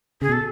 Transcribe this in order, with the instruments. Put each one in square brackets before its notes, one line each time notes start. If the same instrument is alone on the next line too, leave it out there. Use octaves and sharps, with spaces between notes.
[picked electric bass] C#3 [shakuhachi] G#4
[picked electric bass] B2 [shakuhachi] A4